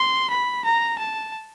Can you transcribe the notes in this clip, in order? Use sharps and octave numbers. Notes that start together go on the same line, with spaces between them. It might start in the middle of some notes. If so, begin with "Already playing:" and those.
Already playing: C6
B5
A#5
A5